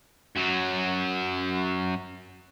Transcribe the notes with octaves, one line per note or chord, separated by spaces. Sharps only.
F#2 F#3